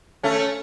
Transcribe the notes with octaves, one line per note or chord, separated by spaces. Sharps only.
A3 C#4